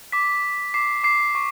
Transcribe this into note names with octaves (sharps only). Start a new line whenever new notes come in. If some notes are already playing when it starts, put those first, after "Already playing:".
D6 B6
D6
D6 C7
D6 C7
C#6